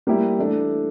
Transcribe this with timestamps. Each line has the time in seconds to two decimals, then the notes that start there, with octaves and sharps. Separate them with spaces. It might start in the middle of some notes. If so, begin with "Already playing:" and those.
0.07 G3 A#3 E4 G4
0.38 E3 A3 D4 A4